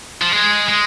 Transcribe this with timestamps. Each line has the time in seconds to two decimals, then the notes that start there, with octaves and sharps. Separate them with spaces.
0.22 F3
0.32 G#3
0.68 G#3